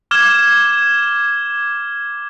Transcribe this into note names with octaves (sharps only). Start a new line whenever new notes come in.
D6 F6 G#6 E7 G7